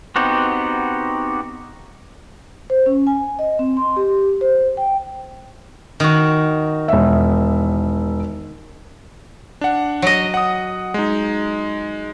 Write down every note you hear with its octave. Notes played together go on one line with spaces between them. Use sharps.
B3 C4 D#4 F#4 G4
C5
C#4
G#5
D#5
C4
C6
G4
C5
G5
D#3 F#4
E1 E5
D4 F#5
F#3 D#5
F#5 D#6
G#3 D#4